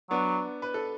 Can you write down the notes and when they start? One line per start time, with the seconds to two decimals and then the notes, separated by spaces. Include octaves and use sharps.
0.10 F#3 B3 D4
0.62 B4
0.74 A4